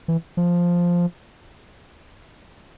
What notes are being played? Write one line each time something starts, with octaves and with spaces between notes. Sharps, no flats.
E3
F3